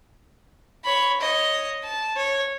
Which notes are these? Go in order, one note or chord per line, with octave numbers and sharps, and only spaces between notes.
C#5 B5
C#5 D#5
A5
C#5